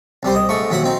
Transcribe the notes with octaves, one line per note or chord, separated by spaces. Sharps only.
C2 G3 C5
D#5
G#2 A3 C#6
D#2 F#3 E5 F#5
C4 D#4